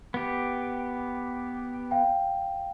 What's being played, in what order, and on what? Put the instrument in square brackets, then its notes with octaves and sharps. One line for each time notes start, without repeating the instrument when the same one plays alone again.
[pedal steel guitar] B3 G4
[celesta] F5 G5